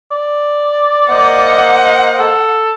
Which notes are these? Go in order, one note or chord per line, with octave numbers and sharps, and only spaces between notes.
D5
A#3 C5 D#5 F#5
A4